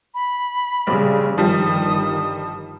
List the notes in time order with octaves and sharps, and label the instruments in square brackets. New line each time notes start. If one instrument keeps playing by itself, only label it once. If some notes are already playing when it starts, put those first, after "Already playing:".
[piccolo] B5
[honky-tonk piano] A#1 [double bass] C#3 G3
[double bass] G1 D#3 [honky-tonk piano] F3 G3 [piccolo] D#6